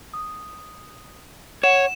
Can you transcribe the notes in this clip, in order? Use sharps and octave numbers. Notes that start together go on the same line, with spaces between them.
D#6
C#5 F#5 E7